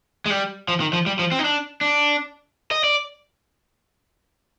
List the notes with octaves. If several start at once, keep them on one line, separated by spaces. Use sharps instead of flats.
G#3
G3
F3
D#3
F3
G3
F3
C4
D#4
D4
D4
D#5
D5